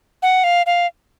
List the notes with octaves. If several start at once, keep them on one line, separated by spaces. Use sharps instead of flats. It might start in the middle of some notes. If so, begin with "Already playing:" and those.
F#5
F5
F5